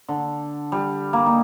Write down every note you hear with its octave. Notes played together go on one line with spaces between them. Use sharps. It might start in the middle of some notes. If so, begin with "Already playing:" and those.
D3
G3
A#3
D#4